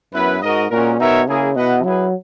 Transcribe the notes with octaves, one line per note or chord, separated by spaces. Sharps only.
F#2 B3 E4 B4
G#2 F#4 A#4 D#5
A#2 G#3 C#4 F#4 A#4
B2 D#4 A#4 C#5 E5
C#3 A#3 E4 G#4
B2 E4 B4 D#5 F#5
F#3 E4 G#4 B4